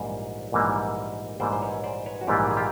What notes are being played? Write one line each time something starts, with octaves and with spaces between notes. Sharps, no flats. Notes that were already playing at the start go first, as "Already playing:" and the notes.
Already playing: A#1 G#2 E3 G3 A#3
A#1 G#2 E3 G3 A#3
A#1 G#2 E3 G3 A#3 C5 D5
C5
B4 C#5
C5 D5
B4 C#5
F#4
A#1 G#2 E3 G3 A#3 F4 G4
G#4
F4 G4